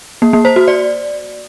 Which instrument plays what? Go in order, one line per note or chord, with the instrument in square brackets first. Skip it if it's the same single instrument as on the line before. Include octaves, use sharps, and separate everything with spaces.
[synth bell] A#3
A#3
C5
F#4
D5